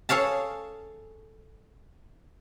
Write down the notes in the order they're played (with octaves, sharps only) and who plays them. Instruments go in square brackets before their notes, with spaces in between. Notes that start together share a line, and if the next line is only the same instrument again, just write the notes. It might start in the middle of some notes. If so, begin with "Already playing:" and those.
[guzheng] G#4 A4 C#5 F5 A5